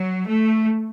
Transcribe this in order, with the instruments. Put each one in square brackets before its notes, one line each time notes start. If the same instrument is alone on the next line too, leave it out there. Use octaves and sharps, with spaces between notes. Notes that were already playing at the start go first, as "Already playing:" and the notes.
Already playing: [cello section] F#3
A3